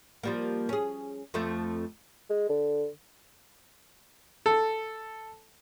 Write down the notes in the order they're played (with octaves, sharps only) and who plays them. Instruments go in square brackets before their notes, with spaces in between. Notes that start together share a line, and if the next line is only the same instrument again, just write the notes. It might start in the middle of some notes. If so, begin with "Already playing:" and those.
[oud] F3 G3 A#3
C#4 G#4
F2 F3 A3
[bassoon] G#3
D3
[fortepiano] A4